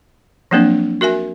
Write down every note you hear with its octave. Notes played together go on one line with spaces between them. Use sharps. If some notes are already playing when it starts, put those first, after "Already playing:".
F3 F#3 A#3 C4 D4
F#4 A#4 E5 G#5